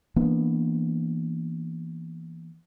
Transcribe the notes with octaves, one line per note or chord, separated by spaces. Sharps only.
E3 A#3 B3 D4